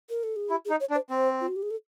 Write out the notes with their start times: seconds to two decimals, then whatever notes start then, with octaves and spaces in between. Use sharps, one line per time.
0.10 A#4
0.23 A4
0.36 G#4
0.50 E4 G4
0.65 G#4
0.70 D#4
0.80 C#5
0.90 D4
0.95 C5
1.10 C4 C5
1.41 F4
1.48 F#4
1.56 G4
1.63 G#4
1.71 A4